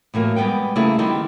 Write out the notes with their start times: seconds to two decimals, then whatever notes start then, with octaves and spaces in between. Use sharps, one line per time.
0.14 A2 E3 F#3 A#3
0.36 G3 G#3 B3 B4 G5
0.75 C#3 A3 A#3 E4 G#4 A4
0.98 D#3 G3 B3 C4 D#4 E4